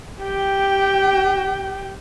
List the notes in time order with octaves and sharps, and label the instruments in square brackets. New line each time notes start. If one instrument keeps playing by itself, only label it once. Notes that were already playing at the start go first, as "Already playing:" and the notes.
[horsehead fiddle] G4 G5